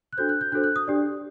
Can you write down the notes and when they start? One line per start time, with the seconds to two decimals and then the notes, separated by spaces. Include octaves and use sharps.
0.13 F#6
0.17 D4 F#4 A4 C5 G6
0.29 F#6
0.41 G6
0.52 D4 F#4 A4 C5 F#6
0.64 F#6
0.76 D#6
0.88 D4 G4 D5